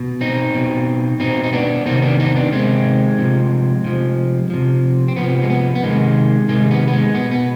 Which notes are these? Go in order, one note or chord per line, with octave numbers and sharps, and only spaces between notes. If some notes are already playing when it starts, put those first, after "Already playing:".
Already playing: B2
C4 D#4
B2
B2 C4 D#4
D#4
B3 D4
C3 D#3 C4 D#4
B3 D4
C4 D#4
B3 D4
C3 D#3 G#3 C4
C3 F3
C3 F3
C3 F3
C4
C3 F3 B3
G#3
B3
B3
C3 D#3 G#3
C3 D#3 G#3
B3
B3
G#3
B2 B3
B3